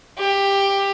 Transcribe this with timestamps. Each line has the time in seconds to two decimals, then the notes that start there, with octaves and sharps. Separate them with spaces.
0.18 G4